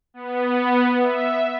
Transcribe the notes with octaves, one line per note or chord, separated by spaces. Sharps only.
B3
E5